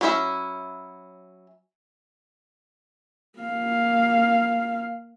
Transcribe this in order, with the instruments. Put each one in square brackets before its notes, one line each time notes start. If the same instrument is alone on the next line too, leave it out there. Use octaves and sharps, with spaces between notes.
[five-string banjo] F#3 C#4 E4 A4 E5
[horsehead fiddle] A#3 F5